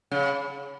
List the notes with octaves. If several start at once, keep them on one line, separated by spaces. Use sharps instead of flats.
C#3